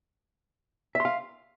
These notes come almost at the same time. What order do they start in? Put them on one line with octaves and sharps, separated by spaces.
E5 C6 F5